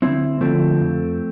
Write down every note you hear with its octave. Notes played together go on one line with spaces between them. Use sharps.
D2 C4 E4
D3 F3 A3 C4
F2